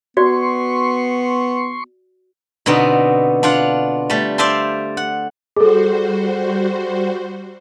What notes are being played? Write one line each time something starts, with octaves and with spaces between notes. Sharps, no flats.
B3 F#4 D5 C6 C#6
B2 D3 B3 C4 D#4
D4 F4 F5 F#5
G3 A3
C5 D5 E5 F5 A5 C6
F#5
G3 F#4 G#4 A4 C5